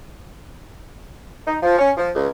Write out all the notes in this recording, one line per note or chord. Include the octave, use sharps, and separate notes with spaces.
D#4
F3
C#4
F3
C#2